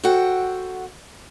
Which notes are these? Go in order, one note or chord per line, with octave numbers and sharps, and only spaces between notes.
F#4 A4 C5 F#5 G5